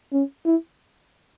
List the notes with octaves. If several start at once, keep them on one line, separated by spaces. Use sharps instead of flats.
C#4
E4